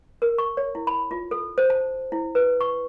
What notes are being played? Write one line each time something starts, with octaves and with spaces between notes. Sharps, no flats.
A#4
C#6
C#5
E4
B5
F4
A4
C5
A5
E4
B4
C#6